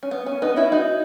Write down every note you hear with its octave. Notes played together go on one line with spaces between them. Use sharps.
C#4
B3
C#4
B3 D#4
C#4 E4
D#4 F#4